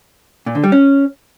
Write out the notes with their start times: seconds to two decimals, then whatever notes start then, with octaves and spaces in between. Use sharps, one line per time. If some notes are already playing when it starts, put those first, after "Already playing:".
0.46 A#2
0.55 D3
0.64 G3
0.72 C#4